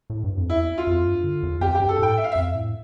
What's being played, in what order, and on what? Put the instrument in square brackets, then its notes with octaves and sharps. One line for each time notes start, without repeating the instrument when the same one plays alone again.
[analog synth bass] A2
G2
F2
[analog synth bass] E2 [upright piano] E4
[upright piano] F4
[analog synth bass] F2
G2
D3
E2
[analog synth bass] F2 [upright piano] G4
[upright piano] G4
[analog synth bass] G2
[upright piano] A4
[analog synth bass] A2 [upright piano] G5
[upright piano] E5
F5
[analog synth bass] F2 [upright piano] E5
[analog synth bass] A2